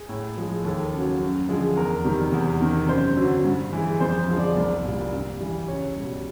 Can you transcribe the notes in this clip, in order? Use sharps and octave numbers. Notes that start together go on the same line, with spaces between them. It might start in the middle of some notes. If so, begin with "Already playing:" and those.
Already playing: G#4
A2
F3 G#3
D#2 A4
C#3 F#3
F#2
D3 F3 G#3
E2 A#4
C3 D#3 G3
E2
C3 D#3
F#2 C5
D3 F#3
G2
E3 G#3
F2 C5
D3 F3 G#3
D5
C2 D5
A#2 G3
G2
E3 G3
C#2 C#5
B2 G3